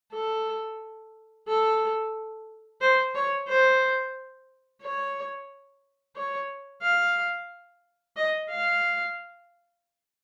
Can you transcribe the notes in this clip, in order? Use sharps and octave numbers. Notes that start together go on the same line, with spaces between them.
A4
A4
C5
C#5
C5
C#5
C#5
F5
D#5
F5